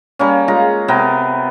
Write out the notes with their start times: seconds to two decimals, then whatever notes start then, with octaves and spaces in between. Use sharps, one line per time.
0.19 G3 A#3 C#4
0.48 G#3 F4 A#5
0.88 C3 B3 A#4 G5